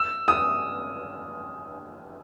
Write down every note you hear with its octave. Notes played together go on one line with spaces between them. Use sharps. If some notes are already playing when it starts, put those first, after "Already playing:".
Already playing: E6
D#6